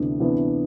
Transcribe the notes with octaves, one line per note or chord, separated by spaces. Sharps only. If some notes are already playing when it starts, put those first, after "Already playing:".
Already playing: D2 C3 E3 B3 D4
C3 E3 B3 D4